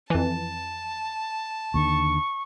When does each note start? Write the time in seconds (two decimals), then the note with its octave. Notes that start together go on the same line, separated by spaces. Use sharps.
0.10 F2 E3 A5
1.74 D#2 D3 C#6